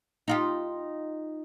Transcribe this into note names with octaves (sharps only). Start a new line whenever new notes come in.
D#4 F4 G4